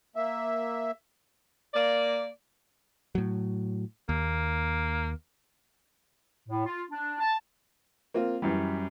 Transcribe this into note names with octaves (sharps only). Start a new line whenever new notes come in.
A#3 E5
A#3 D5
A2 F#3
D#2 A#3
A2
F4
D4
A5
A#3 C4 F4
F#2 E3 G3